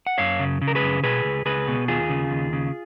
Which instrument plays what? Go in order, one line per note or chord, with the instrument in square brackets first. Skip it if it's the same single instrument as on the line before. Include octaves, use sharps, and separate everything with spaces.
[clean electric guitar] F#5
F#2 C#5 F5
C#3
C#3
A#4
G#4 B4
F#2
B2 G#4 B4
C#2
C#2 G#4 B4
B2
D#2 F4 G#4
C#3
D#2
C#3